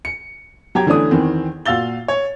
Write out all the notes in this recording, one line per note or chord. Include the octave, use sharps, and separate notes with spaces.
C#7
F#3 G4 A#5 G#6
D3 E3 A3 C#4 D4 D#6
E2 D#3 E3 C4
A#2 F#4 F5 E6 A6 G7
C#5